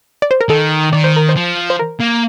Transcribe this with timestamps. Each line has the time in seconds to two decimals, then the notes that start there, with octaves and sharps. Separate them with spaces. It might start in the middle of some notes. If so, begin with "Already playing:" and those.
0.22 D5
0.31 C5
0.41 A#4
0.49 D#3 A4
0.93 D#3 D5
1.04 C5
1.16 A#4
1.29 C5
1.36 F3
1.70 C5
1.79 A#4
2.00 A#3